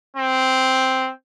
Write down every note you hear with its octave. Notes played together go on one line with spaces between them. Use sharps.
C4